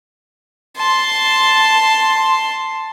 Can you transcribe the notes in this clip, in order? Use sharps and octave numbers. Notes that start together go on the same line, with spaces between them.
A5 C6